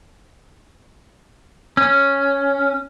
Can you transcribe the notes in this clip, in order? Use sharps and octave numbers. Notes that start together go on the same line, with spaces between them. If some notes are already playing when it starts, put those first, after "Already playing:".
C#4